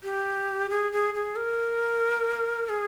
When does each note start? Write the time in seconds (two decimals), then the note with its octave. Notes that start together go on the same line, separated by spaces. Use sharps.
0.04 G4
0.70 G#4
0.92 G#4
1.14 G#4
1.36 A#4
2.69 G#4